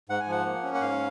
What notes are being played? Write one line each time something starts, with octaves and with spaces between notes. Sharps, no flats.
G#2 F#5
G#5
F3 F#5
A#3
C#4
F#5
G#2 F5